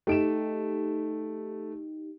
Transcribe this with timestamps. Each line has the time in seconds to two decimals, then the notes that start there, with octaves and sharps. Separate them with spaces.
0.07 A3 D#4 G4 D7 E7